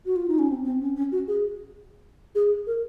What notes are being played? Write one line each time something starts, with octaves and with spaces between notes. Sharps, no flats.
F#4
F4
D#4
C#4
C4
C4
C#4
C#4
F#4
G#4
G#4
A#4